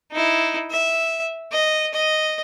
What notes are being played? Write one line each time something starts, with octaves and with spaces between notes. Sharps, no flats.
D#4 E4
E5
D#5
D#5